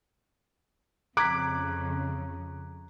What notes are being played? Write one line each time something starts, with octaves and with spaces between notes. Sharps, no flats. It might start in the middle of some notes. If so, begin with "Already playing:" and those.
F2 C#3 A#5 D6 F#6 G#6 B6 D7